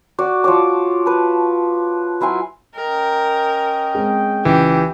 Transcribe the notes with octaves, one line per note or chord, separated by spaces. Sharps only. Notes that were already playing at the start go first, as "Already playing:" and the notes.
F#4 D5
F3 C#5 D6
B4 A5
F#3 E4 F4 G#5
C#4 A#4 D#5 G5
G#3 C4
C#2 E3 G4